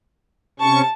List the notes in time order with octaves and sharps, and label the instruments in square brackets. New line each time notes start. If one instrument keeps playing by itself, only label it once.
[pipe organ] C3 C#4 C#6 [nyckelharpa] A5